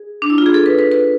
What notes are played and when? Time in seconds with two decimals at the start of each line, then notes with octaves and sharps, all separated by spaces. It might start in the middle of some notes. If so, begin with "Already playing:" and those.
Already playing: G#4
0.22 D4
0.30 E4
0.38 F4
0.46 G#4
0.54 A4
0.66 B4
0.79 B4
0.92 B4